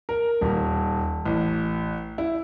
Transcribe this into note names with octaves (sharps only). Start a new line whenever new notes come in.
A#4
D#1
A1
E4